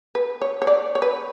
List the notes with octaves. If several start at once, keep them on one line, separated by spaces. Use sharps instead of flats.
B4
C#5
C#5
D5
C#5
B4